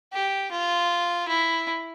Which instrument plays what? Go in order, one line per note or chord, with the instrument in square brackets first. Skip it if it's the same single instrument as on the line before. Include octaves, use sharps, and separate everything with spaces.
[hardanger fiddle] G4
F4
E4